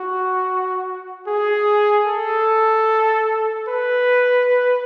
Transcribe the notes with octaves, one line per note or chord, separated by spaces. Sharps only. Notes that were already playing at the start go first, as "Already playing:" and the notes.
Already playing: F#4
G#4
A4
B4